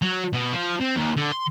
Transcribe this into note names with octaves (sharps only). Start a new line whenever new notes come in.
F#3
B2
F3
C4
D#2
D3
C6